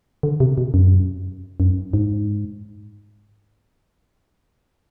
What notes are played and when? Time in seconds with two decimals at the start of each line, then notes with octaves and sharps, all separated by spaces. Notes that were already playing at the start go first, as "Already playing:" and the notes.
0.23 D3
0.40 C3
0.58 B2
0.74 F#2
1.60 F#2
1.93 G#2